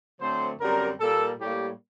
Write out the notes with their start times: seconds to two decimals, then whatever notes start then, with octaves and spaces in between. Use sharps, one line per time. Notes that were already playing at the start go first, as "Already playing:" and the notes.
0.20 D3 F#3 A3 C4 C5
0.60 F#2 D3 G3 C4 A#4
0.99 A#2 G3 A#3 A4
1.39 A2 G3 A#3 G4